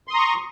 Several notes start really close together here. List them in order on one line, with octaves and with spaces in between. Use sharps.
C6 D#6 A#5 C#6